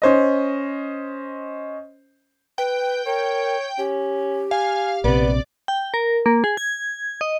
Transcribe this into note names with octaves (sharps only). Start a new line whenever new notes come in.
C#4 C5 D#5
B4 G5
A#4 C#5
C#4 G4
F5 G#5
A#1 C3 B3 D5
G5
A#4
A#3
G#4
G#6
D#5